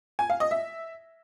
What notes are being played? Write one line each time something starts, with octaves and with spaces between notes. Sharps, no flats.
G#5
F5
D#5
E5